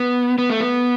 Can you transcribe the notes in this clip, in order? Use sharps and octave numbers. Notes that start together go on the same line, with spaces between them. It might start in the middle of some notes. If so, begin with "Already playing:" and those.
Already playing: B3
B3
A3
B3